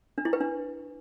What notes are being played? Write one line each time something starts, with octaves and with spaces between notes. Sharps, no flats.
D4
E4
B4
D4